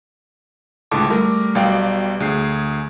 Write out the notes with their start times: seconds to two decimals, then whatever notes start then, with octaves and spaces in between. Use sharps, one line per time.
0.91 C#2 A2 D3 G#3 A5 D6
1.10 G3 A3 A#4
1.55 B1 B2 G3 D5 F5 G5
2.20 D2 G#4 C7